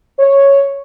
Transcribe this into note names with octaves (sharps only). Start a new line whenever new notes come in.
C#5